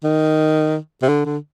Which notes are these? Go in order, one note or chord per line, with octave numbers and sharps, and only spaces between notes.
D#3
C3
D3
D3